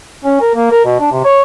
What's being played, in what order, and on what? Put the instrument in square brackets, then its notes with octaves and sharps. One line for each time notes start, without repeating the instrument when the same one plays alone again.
[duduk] C#4
A#4
A#3
A#4
B2
D4
C3
C#5